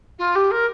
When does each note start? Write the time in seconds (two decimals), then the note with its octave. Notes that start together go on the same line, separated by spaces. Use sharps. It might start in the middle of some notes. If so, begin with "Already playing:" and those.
0.18 F4
0.35 G4
0.51 A#4